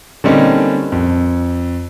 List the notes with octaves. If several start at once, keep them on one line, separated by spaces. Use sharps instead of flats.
D3 G3 A#3 C4 C#4 D#4
F2